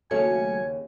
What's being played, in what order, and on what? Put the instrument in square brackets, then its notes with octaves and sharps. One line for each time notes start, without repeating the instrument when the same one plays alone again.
[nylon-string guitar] D#2 C#3 C#4 [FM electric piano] F#3 A3 C#7 [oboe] G#5